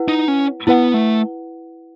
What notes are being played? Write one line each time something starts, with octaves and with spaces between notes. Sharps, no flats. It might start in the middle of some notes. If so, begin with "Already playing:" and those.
Already playing: E4 B4 F#5
D#4
C#4
B3 E4 B4 F#5
A3